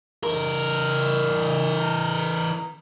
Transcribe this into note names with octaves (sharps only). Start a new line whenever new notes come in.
E3 A#4